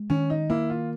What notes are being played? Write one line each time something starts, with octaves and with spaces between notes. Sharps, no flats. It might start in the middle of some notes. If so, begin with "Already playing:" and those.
Already playing: G#3
D#3 C#4
D#4
A#3 E4
F4